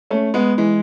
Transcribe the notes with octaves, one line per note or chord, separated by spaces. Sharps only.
A3 C#4
G#3 B3
E3 G#3